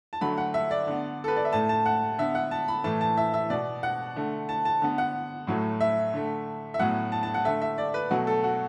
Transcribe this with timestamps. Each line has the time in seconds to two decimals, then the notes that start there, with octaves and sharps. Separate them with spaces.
0.13 A5
0.21 D3 F#3 A3 B5
0.38 F#5
0.54 E5
0.71 D5
0.87 D3 B3
1.24 A4
1.28 B4
1.36 D5
1.45 E5
1.53 A2 A3 A5
1.69 A5
1.86 F#5
2.18 D3 B3 E5
2.35 F#5
2.51 A5
2.68 B5
2.84 A2 E3 A3 A5
3.01 A5
3.17 E5
3.34 E5
3.50 B2 B3 D5
3.83 F#5
4.16 D3 A3
4.49 A5
4.65 A5
4.82 D3 B3
4.98 F#5
5.47 A2 F#3 A3
5.81 E5
6.14 D3 A3
6.74 E5
6.79 A2 F#3 B3 F#5
7.12 A5
7.23 A5
7.34 F#5
7.45 D3 A3 E5
7.62 E5
7.78 D5
7.94 B4
8.11 B2 F#3 A3 F#4
8.27 A4
8.43 F#4